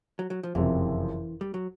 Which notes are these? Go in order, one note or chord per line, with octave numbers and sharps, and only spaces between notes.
F#3
F#3
F3
F#1 F2 C3 E3
G3
F#3